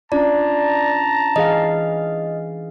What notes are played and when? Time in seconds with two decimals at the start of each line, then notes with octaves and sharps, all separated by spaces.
0.12 C#4 D4 F4 D5 A5 A#5
1.36 E3 G#4 D#5 F5